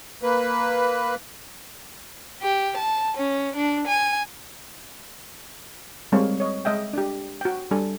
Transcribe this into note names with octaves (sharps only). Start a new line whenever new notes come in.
A#3 B4
G4
A5
C#4
D4
G#5
G3 G#3 C4 A#4 C#5 F5
C#5 D#5
G#3 D#5 E5 G5
D4 G4
F#4 G5
G3 D4 A4 G#5